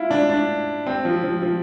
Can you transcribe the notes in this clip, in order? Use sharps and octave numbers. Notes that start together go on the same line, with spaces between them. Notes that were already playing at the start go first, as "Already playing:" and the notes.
Already playing: E4 F4
D4
D4
C4
F3
F3
F3